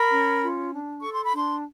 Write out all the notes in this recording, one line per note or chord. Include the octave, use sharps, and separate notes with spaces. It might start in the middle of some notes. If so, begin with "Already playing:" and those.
Already playing: A#4 B5
C#4
F4
D4
A4 C#6
C6
B5
D4 C6